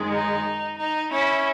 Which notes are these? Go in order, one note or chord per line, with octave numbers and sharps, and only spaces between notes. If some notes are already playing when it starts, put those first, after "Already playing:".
Already playing: F#2 D#3 G#3
D#4
D#4
C#4 E4